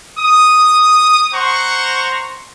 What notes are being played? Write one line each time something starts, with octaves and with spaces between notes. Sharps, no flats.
D#6
C5 F#5 A#5 C6 C#6